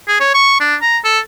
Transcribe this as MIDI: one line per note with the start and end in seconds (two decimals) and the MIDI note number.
0.08 0.17 68
0.20 0.29 73
0.34 0.58 85
0.60 0.75 62
0.81 0.98 82
1.04 1.19 69